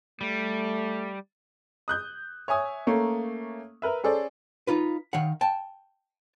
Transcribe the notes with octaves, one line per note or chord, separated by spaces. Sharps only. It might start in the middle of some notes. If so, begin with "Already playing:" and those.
G3 A3
D#6 F#6 G6
C#5 E5 G#5 D#6
A3 A#3 C#4
A#4 B4 E5
C#4 G#4 A4 C5 D5
D#4 F4 B4
D#3 F5 F#5
G5 A5